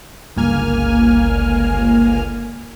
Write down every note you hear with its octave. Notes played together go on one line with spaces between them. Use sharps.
G1 C#2 A#3 G#5 F6